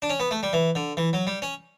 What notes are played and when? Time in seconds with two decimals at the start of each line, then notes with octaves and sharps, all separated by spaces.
0.02 D4
0.10 C#4
0.20 B3
0.31 A3
0.43 G3
0.53 E3
0.75 D3
0.97 E3
1.13 F#3
1.27 G3
1.42 C#4